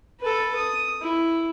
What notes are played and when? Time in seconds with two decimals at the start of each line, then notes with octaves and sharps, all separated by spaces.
0.20 A4 B4
0.55 D#6
1.01 E4